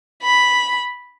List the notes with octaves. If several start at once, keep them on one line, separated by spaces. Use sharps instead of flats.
B5